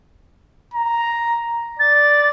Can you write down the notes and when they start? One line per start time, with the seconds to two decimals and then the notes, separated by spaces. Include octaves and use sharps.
0.74 A#5
1.79 D5 A6